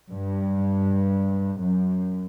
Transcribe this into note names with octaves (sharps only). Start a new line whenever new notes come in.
G2
F#2